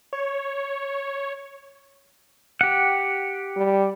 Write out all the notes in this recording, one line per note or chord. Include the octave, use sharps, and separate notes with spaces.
C#5
G4 F#5
G3